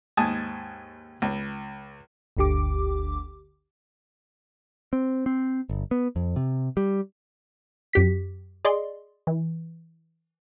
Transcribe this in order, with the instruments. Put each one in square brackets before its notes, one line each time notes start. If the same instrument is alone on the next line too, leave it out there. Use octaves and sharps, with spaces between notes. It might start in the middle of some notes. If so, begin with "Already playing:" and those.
[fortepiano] D#2 G#2 G#5 A5 D#6
C#2
[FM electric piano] G1 D2 D3 G4 D6
[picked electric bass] C4
C4
G1
B3
F2
C3
G3
[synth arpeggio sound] F#2 G4 B6
G#4 D5 D#5 C6
E3